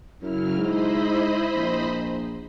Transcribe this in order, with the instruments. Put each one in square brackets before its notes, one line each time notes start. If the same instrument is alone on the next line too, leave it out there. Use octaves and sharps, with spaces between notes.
[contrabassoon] F#2 [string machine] C#3 F#3 F6 [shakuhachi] E4
[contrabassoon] G#2 [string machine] C5 D#5 B5
[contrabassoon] A#1